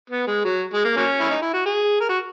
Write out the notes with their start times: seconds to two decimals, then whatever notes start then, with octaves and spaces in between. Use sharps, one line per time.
0.10 B3
0.27 G#3
0.44 F#3
0.74 G#3
0.85 A#3
0.97 F#3 A#3 C#4
1.20 E4
1.30 D#4
1.42 E4
1.53 F#4
1.66 G#4
2.01 A#4
2.09 F#4